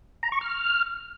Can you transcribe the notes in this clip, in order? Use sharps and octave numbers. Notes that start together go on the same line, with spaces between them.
A#5
C#6
F6